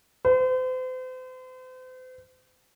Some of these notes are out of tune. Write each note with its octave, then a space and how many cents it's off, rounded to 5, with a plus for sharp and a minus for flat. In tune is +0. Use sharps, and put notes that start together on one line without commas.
C5 -40